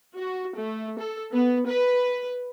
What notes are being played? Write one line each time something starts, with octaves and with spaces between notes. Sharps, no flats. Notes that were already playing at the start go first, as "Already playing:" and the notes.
F#4
A3
A4
B3
B4